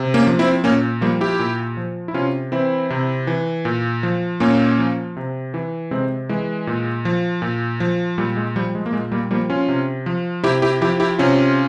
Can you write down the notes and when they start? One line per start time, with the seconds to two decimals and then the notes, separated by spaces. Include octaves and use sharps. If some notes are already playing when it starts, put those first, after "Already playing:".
Already playing: C3
0.14 A#3 C#4
0.27 F3
0.39 C4 E4
0.64 A#2 A#3 C#4
1.01 F3 G3 A#3
1.21 E4 G4
1.39 A#2
1.77 F3
2.08 E4
2.14 C3 C#4 F4
2.52 E3 C4 E4
2.90 C3
3.27 E3
3.65 A#2
4.03 F3
4.40 A#2 A#3 C#4
4.79 F3
5.17 C3
5.54 E3
5.91 C3 G#3 C4
6.29 E3 G#3
6.67 A#2
7.05 F3
7.42 A#2
7.80 F3
8.18 A#2 G3
8.37 G#3
8.56 F3 G3
8.75 G#3
8.86 A#3
8.93 A#2 G#3
9.12 G3 A#3
9.31 F3 G3 A#3
9.50 C#4 F4
9.68 C3
10.06 F3
10.43 C3 E4 G4
10.62 E4 G4
10.81 F3 E4 G4
11.00 E4 G4
11.19 C3 C#4 F4